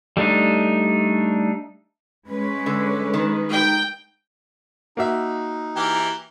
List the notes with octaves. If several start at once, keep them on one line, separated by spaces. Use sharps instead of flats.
G3 A3 D4 D#4
G#3 C#4 B4
D3
D#3
D#4 G5
A#3 D#4 F#4 E5
E3 G4 A#4